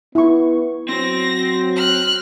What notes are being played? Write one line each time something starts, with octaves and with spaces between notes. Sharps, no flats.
B3 E4 C#6
F#3 C4 C5 A#6
F6 F#6